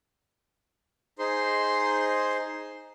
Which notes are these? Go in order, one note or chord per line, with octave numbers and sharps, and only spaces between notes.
D#4 G#4 C5 C6